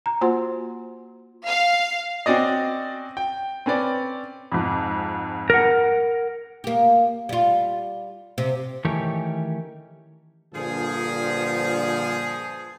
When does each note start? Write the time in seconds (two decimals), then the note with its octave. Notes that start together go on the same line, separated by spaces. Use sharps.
0.06 A#5
0.21 A#3 F4 F#4 C5 F#5 C6
1.48 F5
2.26 C4 C#4 F#4 D5 D#5
3.17 G5
3.66 C4 C#4 B4 D5
4.52 F2 G#2
5.50 A#4 F#5
6.64 A#3 G4
7.29 G3 F4
8.38 C3
8.85 D#3 E3 A3 C#4 G4 C#5
10.54 G2 A#2 D3 F3 G#4